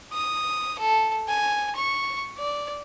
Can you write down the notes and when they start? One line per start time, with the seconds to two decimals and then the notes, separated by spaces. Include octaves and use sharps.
0.13 D#6
0.79 A4
1.28 G#5
1.76 C#6
2.38 D5